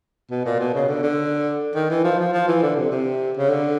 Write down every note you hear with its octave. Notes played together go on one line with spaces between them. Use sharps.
B2
A#2
B2
C#3
D3
D3
D#3
E3
F3
F3
F3
E3
D3
C3
C3
C#3
D3